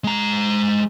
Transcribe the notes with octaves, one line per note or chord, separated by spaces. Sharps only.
G#3 A#5